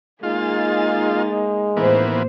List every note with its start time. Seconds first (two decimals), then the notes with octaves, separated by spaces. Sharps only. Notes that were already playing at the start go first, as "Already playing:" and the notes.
0.23 G#3 A#3 D#4 F4 G#4 A6
1.77 A1 D#2 E3 A#3 B3 C5